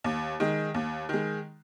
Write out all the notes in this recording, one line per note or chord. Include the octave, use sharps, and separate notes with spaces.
D#2
D#3 G#3
D#2
D#3 G#3